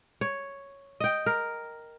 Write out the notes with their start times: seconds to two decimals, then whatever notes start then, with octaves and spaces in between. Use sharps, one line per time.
0.21 C#5
1.00 D#5 G5
1.26 A#4